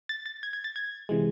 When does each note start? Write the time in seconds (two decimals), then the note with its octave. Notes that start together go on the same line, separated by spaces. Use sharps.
0.09 A6
0.26 A6
0.43 G#6
0.53 G#6
0.64 A6
0.76 G#6
1.09 C3 E3 G#3